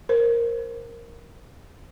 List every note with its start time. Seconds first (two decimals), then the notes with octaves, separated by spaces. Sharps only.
0.09 A#4 C5